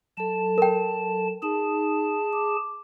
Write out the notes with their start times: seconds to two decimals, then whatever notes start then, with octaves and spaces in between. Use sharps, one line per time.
0.17 F#3 A4 A5
0.58 A#4 G5
1.42 D#4 G#4 A5
2.33 D6